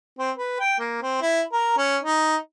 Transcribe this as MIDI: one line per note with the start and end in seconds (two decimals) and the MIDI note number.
0.19 0.31 60
0.37 0.56 71
0.59 0.79 79
0.79 0.98 58
1.02 1.20 60
1.21 1.41 64
1.52 1.76 70
1.77 1.97 61
2.02 2.36 63